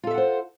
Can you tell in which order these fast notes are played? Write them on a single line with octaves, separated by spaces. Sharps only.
F4 A4 E5 F#5 C5